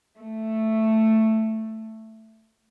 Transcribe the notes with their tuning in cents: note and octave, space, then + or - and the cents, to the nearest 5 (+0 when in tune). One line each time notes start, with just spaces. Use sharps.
A3 +5